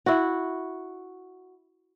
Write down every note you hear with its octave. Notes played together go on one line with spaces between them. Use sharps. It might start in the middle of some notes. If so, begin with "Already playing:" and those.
E4 F#4